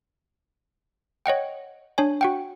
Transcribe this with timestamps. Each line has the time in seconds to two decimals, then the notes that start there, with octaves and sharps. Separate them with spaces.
1.26 C#5 D#5 F#5 G5
1.98 D4 C#5 G#5
2.21 F#4 F#5 G5